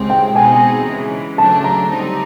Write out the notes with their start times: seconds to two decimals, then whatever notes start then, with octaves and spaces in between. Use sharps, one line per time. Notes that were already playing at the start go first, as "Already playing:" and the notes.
Already playing: C#2 C3 D#3 G#3 C4
0.10 G5
0.36 B2 G#3 C4 D#4 G#4 G#5
0.87 C#3 E3 G#3
1.38 C#3 F#3 A3 D4 A5
1.64 A#5
1.90 D3 G3 C4 D#4